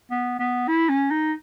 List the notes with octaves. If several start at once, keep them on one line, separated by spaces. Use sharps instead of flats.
B3
B3
E4
C#4
D#4